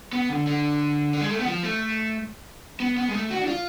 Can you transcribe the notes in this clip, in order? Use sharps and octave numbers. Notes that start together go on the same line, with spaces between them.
B3
D3
D3
D3
G#3
A3
B3
F3
A3
B3
B3
G#3
A3
F#4
D4
F4